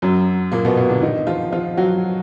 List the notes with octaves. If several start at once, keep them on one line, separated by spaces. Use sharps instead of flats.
F#2 F#3
A#2 A#3
B2 B3
B2 B3
D3 D4
D#3 D#4
F3 F4
F3 F4
F#3 F#4